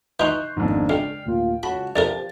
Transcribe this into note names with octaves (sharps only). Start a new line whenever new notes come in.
E3 D#4 C6 C#6 F#6 G6
G#1 F2 G#2 A#3 B3 D4
C#2 D5 G5 F6 C7
D2 A2 A#3 F4
C#2 F#4 A5 B5
G2 C3 F3 G4 A#4 A6